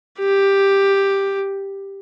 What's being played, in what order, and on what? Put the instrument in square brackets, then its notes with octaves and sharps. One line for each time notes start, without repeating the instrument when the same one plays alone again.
[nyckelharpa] G4